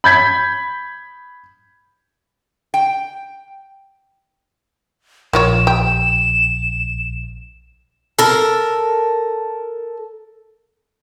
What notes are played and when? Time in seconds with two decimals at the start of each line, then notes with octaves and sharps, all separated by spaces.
0.04 B5 G6 G#6 B6
2.74 G5
5.33 A#1 A#3 F4 C#5 E7
5.67 G4
8.19 A4 A#4